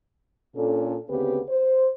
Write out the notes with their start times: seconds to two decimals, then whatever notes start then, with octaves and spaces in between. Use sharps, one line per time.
0.55 A#2 C#4 D4 A4
1.09 D2 C#3 B3 C4 G4 B4
1.49 C5